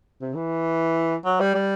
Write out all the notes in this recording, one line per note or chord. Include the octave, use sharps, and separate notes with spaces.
C3
E3
F#3
G3
G3